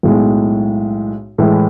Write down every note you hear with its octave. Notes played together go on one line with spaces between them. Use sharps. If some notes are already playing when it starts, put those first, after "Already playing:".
B1 A2 G#3
A2 E3 G#3